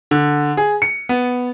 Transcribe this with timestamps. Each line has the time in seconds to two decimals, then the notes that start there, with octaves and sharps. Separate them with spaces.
0.11 D3
0.57 G#4
0.82 C#7
1.09 B3